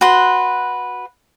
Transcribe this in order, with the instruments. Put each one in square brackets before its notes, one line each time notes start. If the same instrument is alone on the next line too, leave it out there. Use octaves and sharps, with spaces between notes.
[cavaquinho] F#4 B4 C6